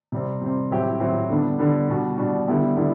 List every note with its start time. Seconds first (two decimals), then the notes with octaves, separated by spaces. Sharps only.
0.12 C3 G3 C4
0.41 C3 G3 C4
0.70 A2 F#3 C4 E4 G4
1.00 A2 F#3 C4 E4 G4
1.29 D3 G3 B3 D4
1.58 D3 G3 B3 D4
1.89 B2 G3 D4 F#4
2.18 B2 G3 D4 F#4
2.48 D3 G3 B3 E4 G4
2.76 D3 G3 B3 E4